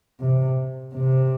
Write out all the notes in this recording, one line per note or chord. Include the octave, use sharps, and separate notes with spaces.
C3
C3